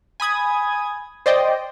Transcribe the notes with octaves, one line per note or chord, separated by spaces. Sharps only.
G#5 B5 D#6 G#6
C5 D5 D#5 G5